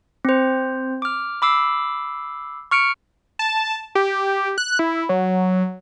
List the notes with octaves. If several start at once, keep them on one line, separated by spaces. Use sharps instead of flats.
C4 C5
D6 F6
B5 D6 E6 C7
C#6 F6 C#7 D7
A5
G4
F#6
E4
F#3